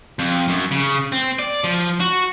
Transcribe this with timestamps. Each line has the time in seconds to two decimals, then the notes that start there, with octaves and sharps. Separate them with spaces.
0.19 F2
0.48 F#2
0.71 C#3
1.12 C4
1.39 D5
1.64 F3
2.00 F#4